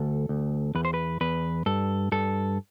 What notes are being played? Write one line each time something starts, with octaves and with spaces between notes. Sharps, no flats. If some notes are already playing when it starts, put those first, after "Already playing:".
Already playing: D2 A4
D2
E2 B4
C5
B4
E2 B4
G2 A4
G2 A4